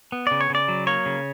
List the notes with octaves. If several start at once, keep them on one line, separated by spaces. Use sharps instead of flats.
B3
C#3 D5
C#5
C#3 D5
F#3
A#3 C#5
C#3